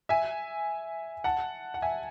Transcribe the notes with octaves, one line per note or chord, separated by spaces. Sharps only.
E5 G#5
F#5 A5
F#5
E5 G#5